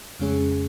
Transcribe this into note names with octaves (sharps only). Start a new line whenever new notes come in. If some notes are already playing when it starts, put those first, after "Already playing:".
F2 C#3 G#3 C#4 G#4